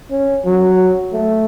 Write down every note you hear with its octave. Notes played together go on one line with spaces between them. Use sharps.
C#4
F#3
A3